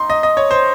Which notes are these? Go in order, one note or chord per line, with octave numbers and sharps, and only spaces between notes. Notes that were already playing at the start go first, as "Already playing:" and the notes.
Already playing: D#4 A#5 C6
D#5
D#5
C#5
C5